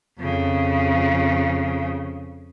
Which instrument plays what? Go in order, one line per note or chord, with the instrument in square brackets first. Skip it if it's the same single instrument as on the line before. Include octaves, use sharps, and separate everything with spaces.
[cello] F2 C#3